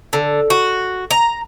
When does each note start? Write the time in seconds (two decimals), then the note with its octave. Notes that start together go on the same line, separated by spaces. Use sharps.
0.13 D3
0.50 F#4
1.11 A#5